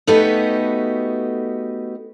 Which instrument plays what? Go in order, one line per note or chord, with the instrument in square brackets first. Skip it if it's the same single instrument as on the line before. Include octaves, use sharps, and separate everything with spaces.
[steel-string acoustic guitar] A3 B3 D#4 F#4 G4 B4